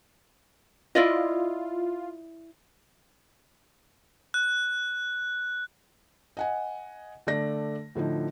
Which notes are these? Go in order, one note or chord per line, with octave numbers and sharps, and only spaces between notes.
E4 F4 D5 D#5
F#6
D#5 F#5 G#5
D3 A3 D5 A#6
A2 D3 F3 D#4